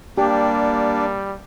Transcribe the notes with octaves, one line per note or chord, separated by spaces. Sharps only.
G3 A#3 D4 G4